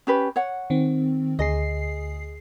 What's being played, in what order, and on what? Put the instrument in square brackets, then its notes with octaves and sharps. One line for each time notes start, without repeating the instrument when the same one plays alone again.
[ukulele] C#4 G4 B4
C#5 F#5
[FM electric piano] D#3 C4
[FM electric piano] D2 G#4 C7 [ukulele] D#5